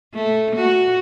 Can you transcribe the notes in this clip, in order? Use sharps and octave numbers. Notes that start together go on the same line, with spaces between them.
A3
F#4